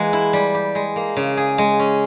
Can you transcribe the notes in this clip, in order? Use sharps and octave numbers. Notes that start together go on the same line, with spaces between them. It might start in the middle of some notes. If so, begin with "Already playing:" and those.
Already playing: E3 G#3 A#3
E4
G3
G4
G#3
A#3
C#3
G#4
G#3
C#4